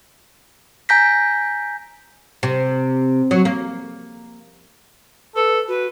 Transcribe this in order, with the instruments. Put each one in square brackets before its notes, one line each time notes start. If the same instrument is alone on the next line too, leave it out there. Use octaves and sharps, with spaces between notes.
[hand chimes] G#5 A#5 G6 A#6 B6
[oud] C3
F#3
A#3
[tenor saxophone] A4 [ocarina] B4
[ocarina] F#4 [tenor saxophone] B4